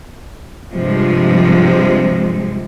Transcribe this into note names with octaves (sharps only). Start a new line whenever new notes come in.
G2 C3 F3 G#3